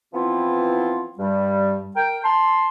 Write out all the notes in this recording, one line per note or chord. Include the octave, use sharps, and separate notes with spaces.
E3 F3 B3 C4 E4 F4
G2 G3
A#4 G5
A5 C6